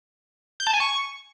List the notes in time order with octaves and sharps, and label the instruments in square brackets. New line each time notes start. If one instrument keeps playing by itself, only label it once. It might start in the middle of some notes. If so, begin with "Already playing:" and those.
[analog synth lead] G6
A5
G#5
C#6